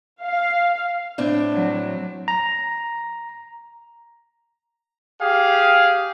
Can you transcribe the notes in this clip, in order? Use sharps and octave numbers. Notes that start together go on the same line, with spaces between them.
F5
A2 C4 D4
F#3
A#5
G4 G#4 F5